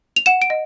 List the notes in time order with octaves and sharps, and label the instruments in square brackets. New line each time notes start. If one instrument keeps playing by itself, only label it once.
[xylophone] F7
F#5 E7
D7
D#5